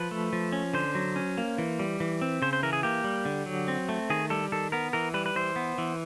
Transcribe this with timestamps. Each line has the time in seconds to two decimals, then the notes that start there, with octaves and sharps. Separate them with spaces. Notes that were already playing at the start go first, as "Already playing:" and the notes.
Already playing: F3 B4
0.11 A3
0.33 F3
0.52 C#4
0.73 D3 C5
0.95 F#3
1.16 C#4
1.38 A#3
1.58 E3
1.79 G3
2.00 E3
2.21 C4
2.42 C#3 C5
2.53 C5
2.63 E3 A#4
2.73 G#4
2.83 A#3 G4
3.04 G3
3.25 D3
3.46 F#3
3.68 C4
3.89 A3
4.10 D#3 G#4
4.30 G3 A4
4.52 D#3 A4
4.72 B3 A#4
4.93 E3 A#4
5.14 G3 B4
5.26 B4
5.36 E3 C5
5.56 B3
5.78 E3